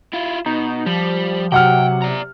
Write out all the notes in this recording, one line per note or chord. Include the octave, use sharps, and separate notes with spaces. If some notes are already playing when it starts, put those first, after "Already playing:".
E4 F4
B2 D#4
F3 G3
C3 F#3 F#5 G5 F6
D5 A#5